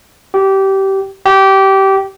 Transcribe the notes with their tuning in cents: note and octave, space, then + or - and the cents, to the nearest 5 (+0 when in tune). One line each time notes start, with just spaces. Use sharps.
G4 -20
G4 -20